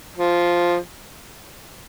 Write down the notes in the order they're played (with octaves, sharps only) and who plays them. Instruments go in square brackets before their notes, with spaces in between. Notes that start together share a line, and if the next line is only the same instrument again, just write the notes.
[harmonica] F3